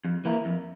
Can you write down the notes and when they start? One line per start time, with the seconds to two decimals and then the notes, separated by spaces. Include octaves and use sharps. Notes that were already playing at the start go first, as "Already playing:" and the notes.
0.05 F2
0.25 E3 A#3 E4 A#4
0.45 F2